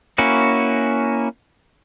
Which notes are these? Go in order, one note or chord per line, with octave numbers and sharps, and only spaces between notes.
A#3 C#4 E4 F#4